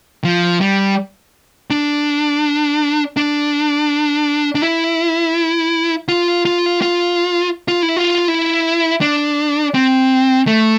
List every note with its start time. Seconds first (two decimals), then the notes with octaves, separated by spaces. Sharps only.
0.24 F3
0.61 G3
1.70 D4
3.17 D4
4.55 D4
4.62 E4
6.08 F4
6.45 F4
6.82 F4
7.68 F4
7.83 E4
7.96 F4
8.28 E4
9.01 D4
9.74 C4
10.47 A3